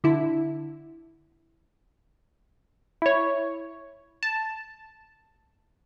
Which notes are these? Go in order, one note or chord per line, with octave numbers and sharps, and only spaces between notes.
D3 E4
E4 C#5
A5